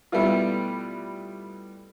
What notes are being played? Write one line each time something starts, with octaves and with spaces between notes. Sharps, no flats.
B2 G3 A3 B3 E4 F4